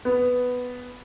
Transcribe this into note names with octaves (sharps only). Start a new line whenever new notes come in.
B3